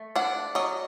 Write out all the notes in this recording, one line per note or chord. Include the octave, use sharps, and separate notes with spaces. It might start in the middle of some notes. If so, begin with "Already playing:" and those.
Already playing: A3
D4 F#5
F#3 D#5